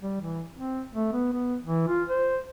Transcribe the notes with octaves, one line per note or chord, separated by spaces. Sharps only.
G3
E3
C4
A3
B3
B3
E3
F4
C5